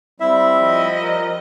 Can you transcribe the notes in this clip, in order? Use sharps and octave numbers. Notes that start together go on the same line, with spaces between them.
G3 C4 E4 E5
F3 D#5
G3 A#4